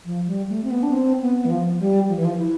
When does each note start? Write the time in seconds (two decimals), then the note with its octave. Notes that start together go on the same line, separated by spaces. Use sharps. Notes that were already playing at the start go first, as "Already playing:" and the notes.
0.05 F3
0.27 G3
0.49 A3
0.64 C4
0.71 B3
0.83 D4
0.92 C4
1.21 B3
1.45 E3
1.50 F3
1.79 G3
2.09 F3
2.17 E3
2.25 F3
2.38 E4